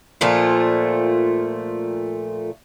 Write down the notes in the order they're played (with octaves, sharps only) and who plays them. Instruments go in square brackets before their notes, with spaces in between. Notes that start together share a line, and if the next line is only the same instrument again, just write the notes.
[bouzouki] A#2 F3 A3 F4